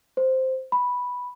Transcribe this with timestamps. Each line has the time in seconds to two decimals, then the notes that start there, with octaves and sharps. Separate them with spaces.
0.17 C5
0.72 B5